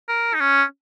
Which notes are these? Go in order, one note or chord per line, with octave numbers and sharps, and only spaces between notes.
A#4
D#4
C#4